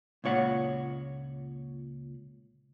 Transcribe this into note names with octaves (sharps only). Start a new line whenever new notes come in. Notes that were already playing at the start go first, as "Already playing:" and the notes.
C#2 A#2 C#5 F#5